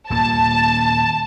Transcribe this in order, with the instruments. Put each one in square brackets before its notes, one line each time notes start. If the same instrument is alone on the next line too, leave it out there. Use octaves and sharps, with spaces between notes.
[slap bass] D#1 A#3 [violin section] A5